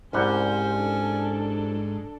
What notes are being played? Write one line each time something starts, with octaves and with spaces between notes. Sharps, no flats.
C2 G#2 G3 C#4 C5 F#5 G6
D4 A4